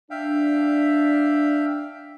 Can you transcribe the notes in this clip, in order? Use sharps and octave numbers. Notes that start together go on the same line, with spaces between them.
D4 E5 F5 G5